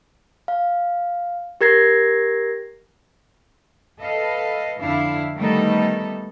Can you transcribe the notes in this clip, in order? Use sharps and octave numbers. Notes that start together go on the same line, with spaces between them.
F5
G4 A#4 G#6 A#6 C7
A4 B4 D#5 F5
F2 D3 D4 E4 F5
D#3 G3 A3 B3 D#4 A4